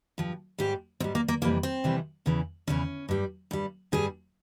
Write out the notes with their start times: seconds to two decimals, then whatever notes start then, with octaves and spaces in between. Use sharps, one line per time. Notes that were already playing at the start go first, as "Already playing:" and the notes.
0.18 G2 F3
0.59 G#2 G3 G4
1.00 G#2 G3 C4
1.15 A#3
1.28 A#3
1.42 F2 C3 E3 G3 A#3
1.63 C4
1.84 F2 C3 E3 G3
2.26 E2 C#3 E3
2.67 E2 C#3 E3 C#4
3.09 G2 G3
3.51 G2 G3
3.92 G2 G3 G#4